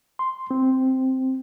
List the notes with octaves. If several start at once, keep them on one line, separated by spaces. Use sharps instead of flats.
C6
C4